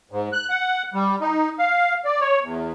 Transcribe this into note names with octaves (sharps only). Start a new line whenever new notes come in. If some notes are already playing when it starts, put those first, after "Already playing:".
G#2
F#6
F#5
G3
D#4
F5
D5
C#5
E2